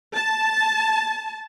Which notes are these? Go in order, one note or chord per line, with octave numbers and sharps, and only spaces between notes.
A5